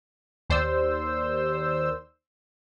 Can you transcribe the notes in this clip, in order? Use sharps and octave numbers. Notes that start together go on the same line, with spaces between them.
D#2 C5 D5 E6